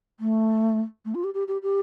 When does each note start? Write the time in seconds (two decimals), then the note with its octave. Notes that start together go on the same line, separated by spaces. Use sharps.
0.20 A3
1.05 A3
1.15 F4
1.24 G4
1.34 G4
1.48 G4
1.62 G4